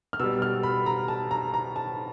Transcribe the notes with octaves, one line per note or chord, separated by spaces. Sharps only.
F6
B2 G3 E6
F6
B5
A#5
A5
A#5
A#5
A5